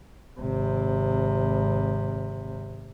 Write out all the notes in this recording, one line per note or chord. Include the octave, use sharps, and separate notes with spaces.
G#1 C3